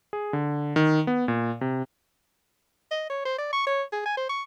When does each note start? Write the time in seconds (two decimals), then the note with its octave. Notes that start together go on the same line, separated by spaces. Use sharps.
0.13 G#4
0.33 D3
0.76 D#3
1.07 B3
1.28 A#2
1.61 C3
2.91 D#5
3.10 C#5
3.25 C5
3.38 D5
3.53 C#6
3.67 C#5
3.92 G#4
4.06 G#5
4.17 C5
4.29 C#6